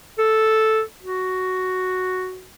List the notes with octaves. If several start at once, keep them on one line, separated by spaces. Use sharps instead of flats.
A4
F#4